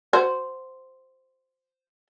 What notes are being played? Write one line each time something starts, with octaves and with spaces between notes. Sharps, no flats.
F#4 C5